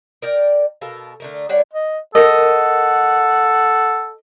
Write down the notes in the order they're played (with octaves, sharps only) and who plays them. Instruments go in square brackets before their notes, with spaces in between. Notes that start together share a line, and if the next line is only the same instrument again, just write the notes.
[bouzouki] A#4 D5 G5
B2 A4 A#4 F5
D3 A3 A#4
G3 D4 C#5 F#5
[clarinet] D#5
[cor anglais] A4 [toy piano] A#4 [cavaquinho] D#5 [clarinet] F#5